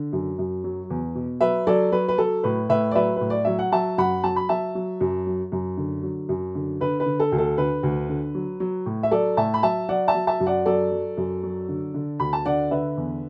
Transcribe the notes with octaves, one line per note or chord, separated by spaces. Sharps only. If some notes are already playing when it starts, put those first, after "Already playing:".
Already playing: D3
F#2
F#2
F#3
E2
B2
F#3 B4 E5
F#3 A4 D5
F#3 B4
B4
F#3 A4
A2 B4
A2 B4 E5
D5
F#3 B4 E5
A2 B4
D5
F#3 E5
F#5
F#3 E5 A5
F#2 F#5 B5
F#3 A5
B5
F#3 E5 A5
F#3
F#2
F#3
F#2
D3
F#3
F#2
D3
D3 B4
B4
D3
A4
D2
A4
D3 B4
D2
D3
F#3
F#3
A2
E5
F#3 A4 D5
A2 E5 A5
B5
F#3 E5 A5
F#3 D5 F#5
E5 A5
F#3
E5 A5
F#2
D5 F#5
F#3 A4 D5
F#3
F#2
F#3
D3
D3
D2 B5
A5
D3 D5 F#5
D3 B4 E5
E2